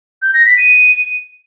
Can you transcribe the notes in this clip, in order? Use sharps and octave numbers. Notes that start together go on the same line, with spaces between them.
G6
A#6
B6
D#7